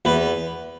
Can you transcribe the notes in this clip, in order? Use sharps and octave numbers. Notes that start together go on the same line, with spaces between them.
E2 B4